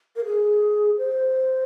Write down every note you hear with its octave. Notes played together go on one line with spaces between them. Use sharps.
A#4
G#4
C5